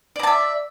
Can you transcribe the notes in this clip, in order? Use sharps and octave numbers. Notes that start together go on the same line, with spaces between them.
D5 E5 A5 A#5